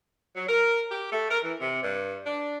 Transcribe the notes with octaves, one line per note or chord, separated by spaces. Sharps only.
F#3
A#4
G4
A3
A#4
E3
C3
G2
D4